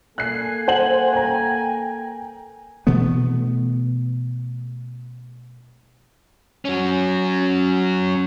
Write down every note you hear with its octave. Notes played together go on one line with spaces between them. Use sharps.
A#3 A4 G#5 F#6 C7
C5 F#5 F#7
G5 A#5
B2 E3 A3 B3
F#3 C#4